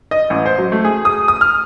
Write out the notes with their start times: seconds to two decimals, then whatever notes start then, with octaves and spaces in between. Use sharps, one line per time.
0.11 D#5
0.30 A1
0.46 C5
0.58 F#3
0.72 A3
0.85 G#4
1.05 D#6
1.28 D#6
1.41 F6